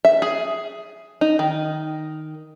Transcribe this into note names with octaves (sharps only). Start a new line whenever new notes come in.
E5
G#4
D#4
D#3